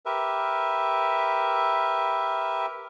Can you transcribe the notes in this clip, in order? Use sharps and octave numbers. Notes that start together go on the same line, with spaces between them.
G4 A#4 B4 E5